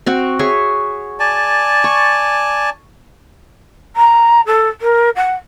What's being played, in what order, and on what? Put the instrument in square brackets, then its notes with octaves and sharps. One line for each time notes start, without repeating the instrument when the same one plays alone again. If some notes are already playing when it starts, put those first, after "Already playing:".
[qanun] C4 F#4 F#5
G#4 C#5 E5
[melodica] D5 G#5 A5
[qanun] C#6
[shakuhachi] A#5
A4
A#4
F#5